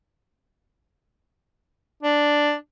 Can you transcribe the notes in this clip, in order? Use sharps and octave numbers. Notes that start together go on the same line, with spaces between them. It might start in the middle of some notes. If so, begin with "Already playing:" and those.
D4